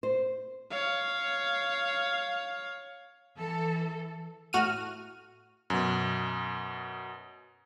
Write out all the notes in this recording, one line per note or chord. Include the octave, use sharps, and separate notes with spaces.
C5
C#5 F5
E3 A4
A2 F#4 F6 D#7
F#2 B2